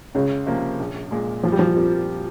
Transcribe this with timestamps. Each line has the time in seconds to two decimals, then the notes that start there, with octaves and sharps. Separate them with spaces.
0.15 C#2 C#3
0.46 C3 F3 A#3 C#4
0.79 A#1
1.11 A#2 G#3
1.43 A#2 F3
1.52 G3
1.59 F3
1.76 G3 C4 G4 A#4